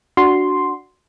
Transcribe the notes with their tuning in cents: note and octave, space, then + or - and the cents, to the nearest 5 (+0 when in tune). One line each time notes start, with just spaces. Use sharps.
D4 +0 F#4 +0 C6 +0